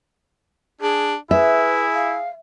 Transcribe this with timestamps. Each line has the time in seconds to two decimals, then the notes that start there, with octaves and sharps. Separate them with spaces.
0.81 D4 G#4
1.31 E4 G#4 B4 E5
1.94 F5